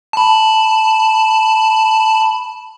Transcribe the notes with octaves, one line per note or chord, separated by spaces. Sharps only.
A5 B5